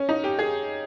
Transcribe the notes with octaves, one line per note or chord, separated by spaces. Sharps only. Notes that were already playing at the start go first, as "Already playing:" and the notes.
Already playing: C#4
D#4
G4
G#4